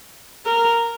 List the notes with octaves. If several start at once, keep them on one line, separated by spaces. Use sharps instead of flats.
A#4